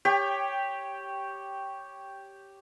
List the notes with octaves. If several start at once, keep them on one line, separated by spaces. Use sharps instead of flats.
G4 C#5 G5